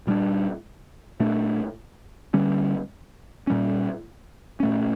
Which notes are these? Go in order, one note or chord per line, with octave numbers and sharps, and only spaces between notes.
A#2 G3 D4
A#2 A3 D4
D3 G3 C#4
A#2 G3 C#4
A#2 A3 C#4